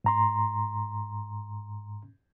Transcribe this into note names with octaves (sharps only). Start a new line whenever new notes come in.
G#2 A#5 C6